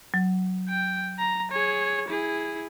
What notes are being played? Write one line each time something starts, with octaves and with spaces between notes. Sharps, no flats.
F#3
G5
A#5
G#4 C#5
E4 G#4